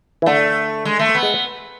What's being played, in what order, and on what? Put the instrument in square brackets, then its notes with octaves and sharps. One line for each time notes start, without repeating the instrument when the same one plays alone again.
[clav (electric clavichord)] E3
[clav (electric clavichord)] D3 [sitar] A3
[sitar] G#3
A3
B3
[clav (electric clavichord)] G#3